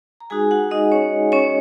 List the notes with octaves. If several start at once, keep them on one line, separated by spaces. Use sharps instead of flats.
A#5
G#3 D#4 F#4 G#4 G#5
F#4 F#5
D#4 D#5
C#4 C#5
C#4 C#5